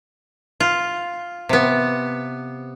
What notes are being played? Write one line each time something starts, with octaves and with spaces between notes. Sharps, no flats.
F4
C3 B3